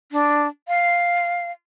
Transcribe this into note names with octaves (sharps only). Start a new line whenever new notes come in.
D4
F5